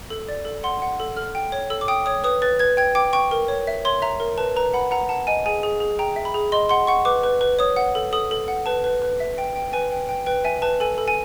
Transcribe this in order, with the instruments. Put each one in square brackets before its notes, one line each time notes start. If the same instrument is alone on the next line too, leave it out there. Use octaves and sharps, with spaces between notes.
[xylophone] A4
D5
A4
F#5 C6
F#5
A4
A4 F6
G5
C#5
A4 E6
D6
G5 D#6
C#5 D#6
B4 D#6
B4 A6
B4 G#6
G5 G#6
G5 D6
G5 C#6
A#4
C#5
E5
C#5 C6
E5 A#5
A#4
B4 A5
B4 A#5
F#5 B5
F#5 A#5
F#5 A5
D#5 G#5
G#4 G#5
G#4
G#4
G5 A#5
E5
B5
G#4
D#5 C6
F#5 C6
F#5 C#6
B4 D6
B4
B4
C#5 D#6
F#5
A4
A4 D#6
A4
F#5
B4 A5
B4
B4
E5
G5
G5
B4 G#5
G5
G5
B4 G5
E5 G#5
B4 A5
A4 G#5
A4
G#5